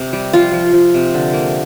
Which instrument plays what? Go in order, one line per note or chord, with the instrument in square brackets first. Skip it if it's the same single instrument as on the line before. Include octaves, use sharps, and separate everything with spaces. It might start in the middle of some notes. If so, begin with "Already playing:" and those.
Already playing: [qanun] C3
G3
F3 F4
F3
F3
C3
D3
A#3